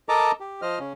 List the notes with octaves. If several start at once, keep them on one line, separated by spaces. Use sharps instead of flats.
A4 A#4 D#5 A5 A#5 D6
G4
F3 C5 D#5 F6
C#3 C#4